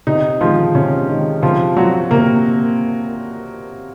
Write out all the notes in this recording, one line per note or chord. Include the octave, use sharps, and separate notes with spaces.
C3 D#4
D#3 F3 G#3 F4
C3 C#4
D#3 G#3
C3 F3 F4
F3 F#3 C4 F#4
C3 A#3 A#4